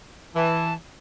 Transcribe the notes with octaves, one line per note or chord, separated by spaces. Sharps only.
E3 A5